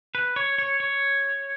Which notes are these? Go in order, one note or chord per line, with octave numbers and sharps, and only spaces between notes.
B4
C#5
C#5
C#5